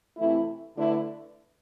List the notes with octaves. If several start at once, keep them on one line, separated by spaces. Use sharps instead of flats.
C3 E3 A3 E4
D3 A3 E4 B4 D5